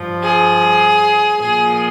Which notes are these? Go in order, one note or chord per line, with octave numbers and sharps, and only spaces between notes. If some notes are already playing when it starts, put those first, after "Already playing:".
Already playing: G2 F3
G#4
A#2 F3 G#4